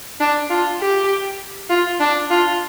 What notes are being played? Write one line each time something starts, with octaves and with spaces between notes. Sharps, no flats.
D4
F4
G4
F4
D4
F4